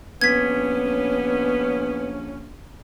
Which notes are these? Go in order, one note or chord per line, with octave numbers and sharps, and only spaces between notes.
A#1 D3 G3 B3 C#4 G#6 B6